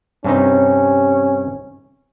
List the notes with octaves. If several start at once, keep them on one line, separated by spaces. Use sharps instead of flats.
G2 C3 C#4 D#4